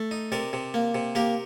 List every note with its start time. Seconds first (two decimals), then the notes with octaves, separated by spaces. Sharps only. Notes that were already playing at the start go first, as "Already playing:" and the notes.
Already playing: A3
0.11 D#4
0.32 C3 A#4 D5
0.53 C3
0.74 A#3
0.95 C3
1.15 A#3 G4 A#4